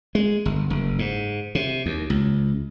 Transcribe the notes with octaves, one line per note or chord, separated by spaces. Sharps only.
G#3
G1
F#1
G#2
C3
D#2
C#2